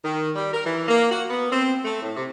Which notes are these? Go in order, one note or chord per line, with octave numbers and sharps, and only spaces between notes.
D#3
G3
A#4
E3
A#3
F#4
B3
C4
A3
A2
C3